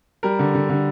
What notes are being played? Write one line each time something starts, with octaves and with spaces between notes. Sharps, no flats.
G3 A#4
D3
D3
D3